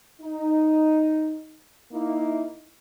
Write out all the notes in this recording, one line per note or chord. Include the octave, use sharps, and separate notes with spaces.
D#4
A#3 D#4 E4